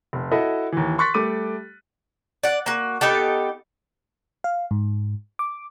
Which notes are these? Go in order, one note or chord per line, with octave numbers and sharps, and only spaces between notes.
F1
E4 F#4 A4 D#5 E5
D#2 E3
C6 C#6 F#6 A6 B6
G3 A3 D6 D#7
D5 F#5
A#3 F#4
B3 D#4 G4 A4
F5
G#2
D6